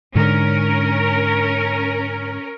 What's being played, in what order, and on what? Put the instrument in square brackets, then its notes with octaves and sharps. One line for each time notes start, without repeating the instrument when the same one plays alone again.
[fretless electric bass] G#2 D3 [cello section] C#4 A#4